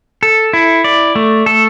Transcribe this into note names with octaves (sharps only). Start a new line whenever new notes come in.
A4
E4
D5
A3
A4